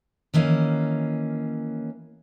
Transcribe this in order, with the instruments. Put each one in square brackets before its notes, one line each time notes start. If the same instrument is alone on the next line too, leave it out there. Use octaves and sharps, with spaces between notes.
[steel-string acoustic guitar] D#3 E3 A#3 C#4